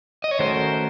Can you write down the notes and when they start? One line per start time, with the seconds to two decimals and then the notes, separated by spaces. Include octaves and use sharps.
0.24 D#5
0.31 C#5
0.39 D#3 A3 C#4 F#4 A#4 C5